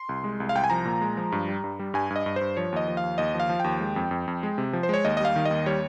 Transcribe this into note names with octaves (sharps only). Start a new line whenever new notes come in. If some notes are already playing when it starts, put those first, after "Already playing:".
Already playing: C6
C2
G#3
C2
F5
C2 G5
G#5
F3 A#5
A#2
G#3
F3
G2
G3
G2
G3
G2 G#5
G2
D#5
G2
G2 C5
F3 C#5
D#2 D#5
F3
F5
D#2
D#2 D#5
F3
F5
F3
D#2 G5
G#3
F2
F2
F2
G#3
C3
F3
C5
G#3 C#5
D#2 D#5
D#5
G3 F5
D#3
D#5
D#2
G3 C#5